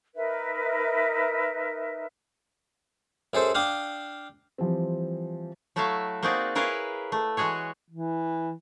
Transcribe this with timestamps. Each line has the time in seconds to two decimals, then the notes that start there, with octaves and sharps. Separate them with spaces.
0.16 D#4 A#4 B4 E5
3.33 F#2 G#4 A4 C5
3.55 D4 F5 G5 D6 D#6
4.58 E3 F3 G3 C4
5.76 F#3 A3 E4 F#4 E5 F5
6.23 A#3 C4 D#4 F#4 G#4 D5
6.55 E4 G#4 A#4 B4 C#5 F5
7.12 A3
7.37 E3 G#3 F#4 G#4 C#5
7.91 E3